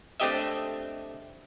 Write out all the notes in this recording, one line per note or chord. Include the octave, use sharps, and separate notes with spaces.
A3 C4 D4 G4 D#5 E5